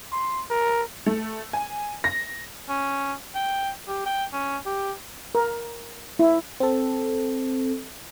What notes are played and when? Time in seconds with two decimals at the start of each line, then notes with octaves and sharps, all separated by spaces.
0.12 C6
0.50 A#4
1.06 A3
1.53 G#5
2.04 A#6
2.69 C#4
3.35 G5
3.88 G4
4.06 G5
4.33 C#4
4.66 G4
5.35 A#4
6.19 E4
6.60 C4 A4